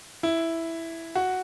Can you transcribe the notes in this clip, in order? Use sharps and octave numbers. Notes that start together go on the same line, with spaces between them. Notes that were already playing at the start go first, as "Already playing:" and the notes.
E4
F#4